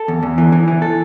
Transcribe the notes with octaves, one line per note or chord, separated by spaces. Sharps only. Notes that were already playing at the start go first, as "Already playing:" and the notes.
Already playing: A4
E2
E2
E3
E3
E3
A4